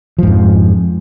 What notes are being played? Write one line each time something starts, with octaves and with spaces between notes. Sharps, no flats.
F2 G#2 F3